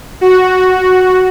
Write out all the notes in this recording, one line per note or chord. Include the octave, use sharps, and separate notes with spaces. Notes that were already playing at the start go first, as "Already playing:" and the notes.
F#4